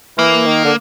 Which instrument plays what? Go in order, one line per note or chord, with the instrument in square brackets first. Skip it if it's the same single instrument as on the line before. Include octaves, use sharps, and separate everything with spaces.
[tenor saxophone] E3 [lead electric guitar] A#3
[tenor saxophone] D#3
D3